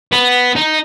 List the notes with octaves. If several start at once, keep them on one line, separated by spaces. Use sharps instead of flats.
B3
D#4